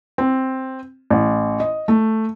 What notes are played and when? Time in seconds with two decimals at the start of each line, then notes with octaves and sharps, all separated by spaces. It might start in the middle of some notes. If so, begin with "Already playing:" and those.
0.18 C4
1.10 A1
1.60 D#5
1.88 A3